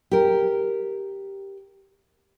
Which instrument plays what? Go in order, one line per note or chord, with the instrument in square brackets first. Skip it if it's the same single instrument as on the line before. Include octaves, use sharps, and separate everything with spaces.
[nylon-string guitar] G4 A#4